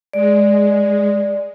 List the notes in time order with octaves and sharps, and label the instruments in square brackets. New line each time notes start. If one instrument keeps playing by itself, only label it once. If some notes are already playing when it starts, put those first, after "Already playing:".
[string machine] G#3 [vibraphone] D5